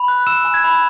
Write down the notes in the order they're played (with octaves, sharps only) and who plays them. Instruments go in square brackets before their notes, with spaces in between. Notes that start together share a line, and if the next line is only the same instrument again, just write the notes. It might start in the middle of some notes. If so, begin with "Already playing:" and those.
Already playing: [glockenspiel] B5
F#6
E6 E7
G#5
G#6
B5